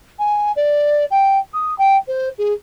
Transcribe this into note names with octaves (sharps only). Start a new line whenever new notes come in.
G#5
D5
G5
D#6
G5
C5
G#4